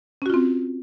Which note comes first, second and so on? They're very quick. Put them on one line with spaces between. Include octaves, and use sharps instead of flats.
C#4 F#4 F4 C4